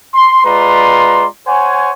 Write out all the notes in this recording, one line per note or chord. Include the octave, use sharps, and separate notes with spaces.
C6
G#3 F4 B4 D5 A#5 C6
C5 C#5 F#5 G#5